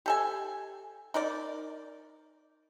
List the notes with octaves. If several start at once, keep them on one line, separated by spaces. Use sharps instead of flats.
G4 A4 G#5
D#4 A#4 D5